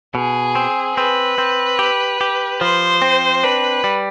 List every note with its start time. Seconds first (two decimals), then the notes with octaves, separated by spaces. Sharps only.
0.15 B2 G#4
0.55 C4
0.96 C4 B4
1.38 C4
1.79 G4
2.21 G4
2.61 F3 C5
3.02 C4
3.43 D4 B4
3.84 G3